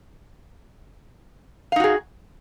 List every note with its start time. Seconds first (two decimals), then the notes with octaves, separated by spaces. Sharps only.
1.72 F5
1.76 D#4
1.80 F#4
1.84 G#4